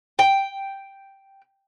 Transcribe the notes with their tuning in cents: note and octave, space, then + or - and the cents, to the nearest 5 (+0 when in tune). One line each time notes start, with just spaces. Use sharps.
G5 +0